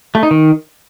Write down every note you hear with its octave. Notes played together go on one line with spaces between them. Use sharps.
A3
D#4
D#3